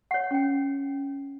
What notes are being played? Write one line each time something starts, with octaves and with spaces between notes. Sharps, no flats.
C#5 F#5
C#4 G5